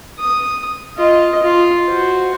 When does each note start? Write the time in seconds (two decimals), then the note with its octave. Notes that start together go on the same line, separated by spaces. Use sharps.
0.19 D#6
0.96 F4 D#5
1.43 F4
1.89 F#4 C5